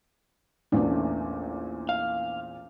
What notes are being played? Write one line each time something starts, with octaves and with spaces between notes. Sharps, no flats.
A#1 E2 A#2 A3 C#4 D4
F5